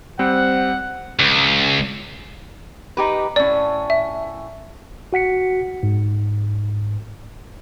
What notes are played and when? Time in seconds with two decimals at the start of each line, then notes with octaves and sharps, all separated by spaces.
0.19 G3 C4 C5 F#5
1.19 C#2
2.97 D#4 G4 B4
3.36 A2 C#4 D5
3.90 E5
5.13 F#4 F#5 B6 C#7
5.83 G#2